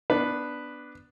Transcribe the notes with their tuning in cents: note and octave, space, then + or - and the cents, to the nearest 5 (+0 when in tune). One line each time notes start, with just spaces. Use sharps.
B3 +0 D4 +0 B4 +0